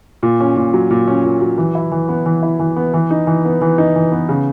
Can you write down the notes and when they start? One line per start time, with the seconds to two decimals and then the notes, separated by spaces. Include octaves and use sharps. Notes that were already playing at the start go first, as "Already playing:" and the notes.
0.23 A#2
0.40 C#4
0.57 A#2
0.73 F#3
0.91 A#2
1.08 C#4
1.24 A#2
1.41 F#3
1.58 E3
1.75 E4
1.92 E3
2.09 B3
2.26 E3
2.43 E4
2.59 E3
2.76 B3
2.94 E3
3.11 D#4
3.27 E3
3.45 B3
3.62 E3
3.78 D#4
3.96 E3
4.12 B3
4.29 C#3